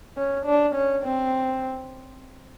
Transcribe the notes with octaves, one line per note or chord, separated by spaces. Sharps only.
C#4
D4
C#4
C4